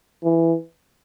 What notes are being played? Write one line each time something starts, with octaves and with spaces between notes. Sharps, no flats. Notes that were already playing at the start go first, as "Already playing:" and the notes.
E3